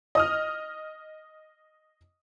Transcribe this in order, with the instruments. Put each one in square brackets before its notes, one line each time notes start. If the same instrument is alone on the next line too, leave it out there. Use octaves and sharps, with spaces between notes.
[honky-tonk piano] D#5 D#6 F6